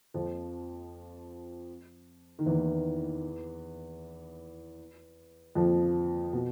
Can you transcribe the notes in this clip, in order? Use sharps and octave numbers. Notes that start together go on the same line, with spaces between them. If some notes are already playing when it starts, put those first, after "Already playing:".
F2 F3
D#3
E2 E3
F2 F3
B2